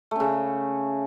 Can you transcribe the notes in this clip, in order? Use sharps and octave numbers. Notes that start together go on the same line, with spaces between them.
C#3 A3 C#4